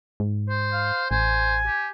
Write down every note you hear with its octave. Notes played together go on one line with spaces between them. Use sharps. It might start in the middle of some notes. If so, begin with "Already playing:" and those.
G#2
C5
F5
A1 C5 G#5
G4